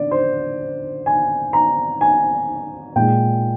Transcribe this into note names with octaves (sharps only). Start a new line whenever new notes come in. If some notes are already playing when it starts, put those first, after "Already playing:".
Already playing: D3 D5
C5
G#5
A#5
G#5
A#2 G#3 G5